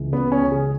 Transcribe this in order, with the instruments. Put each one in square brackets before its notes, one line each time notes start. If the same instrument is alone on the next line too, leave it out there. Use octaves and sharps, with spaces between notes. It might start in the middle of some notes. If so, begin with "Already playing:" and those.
Already playing: [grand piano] C#2 E3
[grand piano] C#3 [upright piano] B3
[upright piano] C#4
[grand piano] C#2
[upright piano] G#4